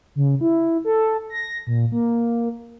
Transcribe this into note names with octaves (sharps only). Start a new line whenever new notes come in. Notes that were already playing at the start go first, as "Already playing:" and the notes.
C#3
E4
A4
A#6
A#2
A#3